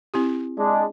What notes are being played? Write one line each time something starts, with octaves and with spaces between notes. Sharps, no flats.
C4 E4 G4
G#3 D4